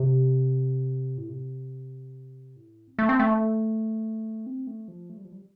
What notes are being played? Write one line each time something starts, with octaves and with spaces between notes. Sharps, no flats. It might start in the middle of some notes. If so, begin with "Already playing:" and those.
Already playing: C3
A2
C3
A2
C4
A3
C4
A3
C4
A3
F3
A3
G3
F3
G3